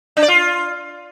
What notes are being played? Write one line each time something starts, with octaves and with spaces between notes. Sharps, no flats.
D4
D5
F4